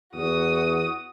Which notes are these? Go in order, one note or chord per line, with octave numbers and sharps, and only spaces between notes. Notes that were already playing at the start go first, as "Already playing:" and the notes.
E2 F#4 D#6